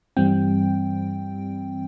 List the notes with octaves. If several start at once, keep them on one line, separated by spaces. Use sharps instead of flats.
G2 E3 G3 C4 G5